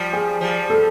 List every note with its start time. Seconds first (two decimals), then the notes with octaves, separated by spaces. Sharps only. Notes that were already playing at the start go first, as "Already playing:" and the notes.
Already playing: F3 G3
0.13 G#4
0.41 F3 G3
0.70 A4